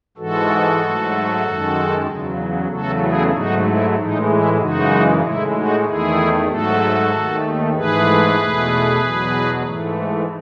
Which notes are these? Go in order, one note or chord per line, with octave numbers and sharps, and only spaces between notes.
G#2 E3 G#3 F#4 A4
G#2 F#3 A3
F#2 D#3 G#3
E2 C#3 F#3
E2 C#3 F#3 A3 F#4 A4
E4 G#4
G#2 F#3 A3 D#4 F#4
E4
A2 E3 G#3 D#4
E4
F#2 C#3 E3 G#3 D#4 F#4
A2 G#3 E4
D#4 F#4
E2 D#3 A3 E4 G#4
G#2 F#3 A3 F#4 A4
D#2 D#3 A3
G#2 E3 A3 G#4 B4
E2 B2 A3
E2 B2 F#3
G#2 E3 A3